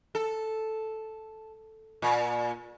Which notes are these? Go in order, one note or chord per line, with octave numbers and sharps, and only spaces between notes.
A4
A#2